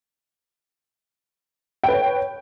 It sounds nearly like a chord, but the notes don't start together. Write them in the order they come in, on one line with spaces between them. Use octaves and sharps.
G5 B4 C#5